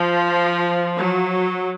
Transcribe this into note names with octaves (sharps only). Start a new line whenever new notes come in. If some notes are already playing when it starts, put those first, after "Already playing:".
Already playing: F3
F#3